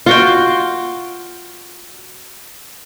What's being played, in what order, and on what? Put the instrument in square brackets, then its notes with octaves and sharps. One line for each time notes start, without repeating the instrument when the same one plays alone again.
[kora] F4 F#4 G5